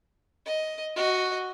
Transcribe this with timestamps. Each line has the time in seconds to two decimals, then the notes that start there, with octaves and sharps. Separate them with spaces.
0.46 D#5
0.95 F#4 D#5